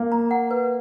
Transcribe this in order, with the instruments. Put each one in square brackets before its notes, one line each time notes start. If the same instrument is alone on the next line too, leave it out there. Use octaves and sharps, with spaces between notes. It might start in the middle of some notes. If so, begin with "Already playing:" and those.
Already playing: [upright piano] A#3
[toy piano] A#5
F#5
B4